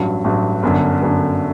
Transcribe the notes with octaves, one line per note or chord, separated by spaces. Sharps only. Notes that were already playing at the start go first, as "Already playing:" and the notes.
Already playing: A1 G2 F#3
A1 G2 F#3
G1 F#2 D3
G1 F#2 D3